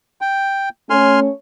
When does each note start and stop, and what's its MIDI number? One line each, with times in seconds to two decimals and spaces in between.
0.21 0.69 79
0.90 1.29 57
0.90 1.29 61
0.90 1.29 73
0.90 1.20 80
0.90 1.20 84
0.90 1.20 89